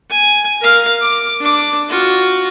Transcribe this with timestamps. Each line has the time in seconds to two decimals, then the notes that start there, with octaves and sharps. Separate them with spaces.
0.11 G#5
0.61 A#4 F5
1.02 D6
1.41 D4 D6
1.90 F4 F#4